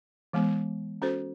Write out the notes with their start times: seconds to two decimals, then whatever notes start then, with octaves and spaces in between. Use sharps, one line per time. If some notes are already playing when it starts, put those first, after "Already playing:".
0.33 E3 G#3 B3
1.02 C#4 F#4 A4 C5